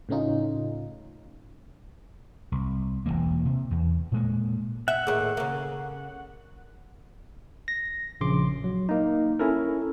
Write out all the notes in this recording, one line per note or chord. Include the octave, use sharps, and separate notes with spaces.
A2 C#3 A3 C#4 D#4 F4
C2
E1 D#2 E3 A#3
C3
E2
A#2 G#3 A#3
E5 F#5
D#2 A2 G#4 A#4 A#5
C#3 A#3 B4
A#6
A#1 C#3 C6 D6
F#3
A#3 D#4
C#4 E4 A4 A#4